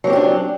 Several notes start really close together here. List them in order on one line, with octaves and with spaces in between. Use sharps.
F#3 C4 G4 F4 D4